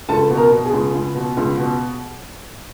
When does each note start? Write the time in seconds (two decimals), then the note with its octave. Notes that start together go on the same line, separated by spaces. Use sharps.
0.09 C#2 A4 A5
0.30 B2
0.36 A#4 A#5
0.51 B2
0.65 G#4 G#5
0.73 C#2
0.94 C#2
1.15 B2
1.37 C#2
1.57 B2